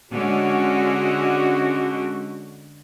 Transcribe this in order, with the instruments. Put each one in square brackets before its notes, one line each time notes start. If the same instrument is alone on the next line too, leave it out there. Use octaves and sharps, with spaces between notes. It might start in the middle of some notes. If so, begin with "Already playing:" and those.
[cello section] D3 G#3 C#4 [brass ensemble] F#4